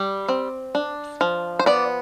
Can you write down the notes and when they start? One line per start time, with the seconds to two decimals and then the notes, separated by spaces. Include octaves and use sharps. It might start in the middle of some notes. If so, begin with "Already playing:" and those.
Already playing: G3
0.29 C4
0.75 D4
1.21 F3
1.59 C5
1.66 B3 D5